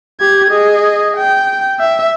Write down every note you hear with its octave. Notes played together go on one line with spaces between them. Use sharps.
G4 G#6
G#4 D#5
G5
E5